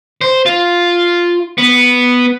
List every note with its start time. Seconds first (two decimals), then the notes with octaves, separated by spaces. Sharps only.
0.21 C5
0.46 F4
1.58 B3